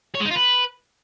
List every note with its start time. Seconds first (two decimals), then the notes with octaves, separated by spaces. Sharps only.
0.15 C#5
0.20 G#3
0.25 D#4
0.30 F4
0.35 B4